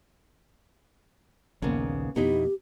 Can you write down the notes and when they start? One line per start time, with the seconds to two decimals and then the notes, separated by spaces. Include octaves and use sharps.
1.62 A#1 D#2 C#3 A#3 B3
2.16 F2 B2 B3 D#4 E4 G4